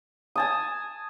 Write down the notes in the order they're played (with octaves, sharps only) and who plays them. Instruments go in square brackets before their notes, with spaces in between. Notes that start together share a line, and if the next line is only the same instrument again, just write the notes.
[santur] G#5 A5 D#6